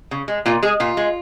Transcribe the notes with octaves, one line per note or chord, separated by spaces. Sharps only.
C#3
G#3
A#2 F4
G#3 G#4
A#2 F4
G#3